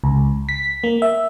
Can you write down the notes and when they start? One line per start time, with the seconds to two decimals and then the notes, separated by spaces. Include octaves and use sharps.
0.04 C#2
0.49 B6
0.84 A#3
1.02 E5